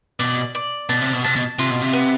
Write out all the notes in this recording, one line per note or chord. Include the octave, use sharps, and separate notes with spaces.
B2 D5
D5
B2 A5
C3
B2
C3 A5
B2
C3 F4
B2
C3
B3